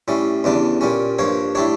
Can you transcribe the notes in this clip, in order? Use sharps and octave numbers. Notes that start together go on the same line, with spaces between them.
A2 G3 C#4
E2 C#3 G3 D4
A#2 G3 C#4
G2 F3 A#3 C#5
A2 G3 D4 C#5